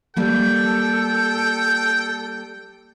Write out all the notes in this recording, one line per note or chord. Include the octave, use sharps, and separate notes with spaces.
G3 A#3 A4 G5